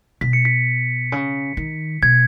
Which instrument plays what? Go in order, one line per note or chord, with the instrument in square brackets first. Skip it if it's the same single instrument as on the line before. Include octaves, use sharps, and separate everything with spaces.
[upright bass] B2 [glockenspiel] B6
[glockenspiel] C#7
B6
[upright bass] C#3
D#3
[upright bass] B2 [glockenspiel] G#6